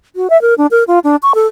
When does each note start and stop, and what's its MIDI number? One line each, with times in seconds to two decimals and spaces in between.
0.16 0.30 66
0.30 0.40 76
0.42 0.54 70
0.58 0.66 62
0.71 0.84 70
0.87 0.99 65
1.04 1.16 62
1.23 1.33 85
1.35 1.47 69